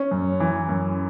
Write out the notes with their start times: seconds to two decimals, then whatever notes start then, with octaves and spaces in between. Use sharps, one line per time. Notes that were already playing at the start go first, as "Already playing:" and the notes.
Already playing: C#4
0.11 F#2
0.40 E3
0.69 F#2